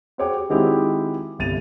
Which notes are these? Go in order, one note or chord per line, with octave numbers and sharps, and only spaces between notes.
F#4 G#4 C5 C#5 G5 D6
G4
D#3 G#3 C4 E4 F#4 G4
G1 C2 A6 D#7 F7